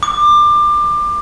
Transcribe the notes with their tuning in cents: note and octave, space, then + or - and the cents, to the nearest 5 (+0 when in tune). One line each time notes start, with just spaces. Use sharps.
D6 +25